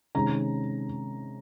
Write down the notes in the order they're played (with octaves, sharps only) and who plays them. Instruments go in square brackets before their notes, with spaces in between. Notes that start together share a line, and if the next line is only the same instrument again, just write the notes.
[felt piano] C3 D#3 G#3 C#4 A#5